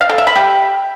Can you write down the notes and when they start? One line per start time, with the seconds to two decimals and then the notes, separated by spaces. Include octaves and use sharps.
0.01 F5
0.09 A4
0.18 E5
0.27 B5
0.35 G4